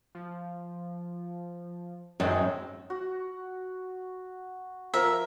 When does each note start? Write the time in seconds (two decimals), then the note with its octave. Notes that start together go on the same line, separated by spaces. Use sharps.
0.15 F3
2.20 F#2 D#3 G#3 C4
2.90 F#4
4.94 F3 A#4 E5